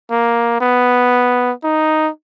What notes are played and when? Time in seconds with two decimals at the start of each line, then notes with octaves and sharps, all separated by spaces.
0.11 A#3
0.61 B3
1.64 D#4